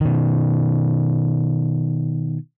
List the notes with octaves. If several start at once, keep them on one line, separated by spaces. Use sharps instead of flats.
B2 D#3